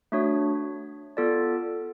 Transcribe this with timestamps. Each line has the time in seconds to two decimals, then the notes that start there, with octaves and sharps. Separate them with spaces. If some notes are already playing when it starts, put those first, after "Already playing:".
0.12 A3 D4 F#4 C#5
1.17 B3 F4 A4 D5